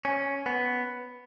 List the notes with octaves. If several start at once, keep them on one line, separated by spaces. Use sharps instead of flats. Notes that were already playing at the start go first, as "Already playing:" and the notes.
C#4
B3